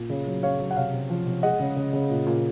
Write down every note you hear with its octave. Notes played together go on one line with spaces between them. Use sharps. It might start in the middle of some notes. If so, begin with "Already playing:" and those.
Already playing: A#2
C#3
F#3
C#3 C#5 F5
F#3
F#5
C3 C#5 F5
C3
F3
C3
G#3 D#5 F#5
C#3
C#3
C#3
A#2
A#2